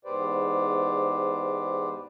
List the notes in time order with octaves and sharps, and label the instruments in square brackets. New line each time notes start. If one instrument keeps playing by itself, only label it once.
[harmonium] E2 G#2 G4 B4 C5 D5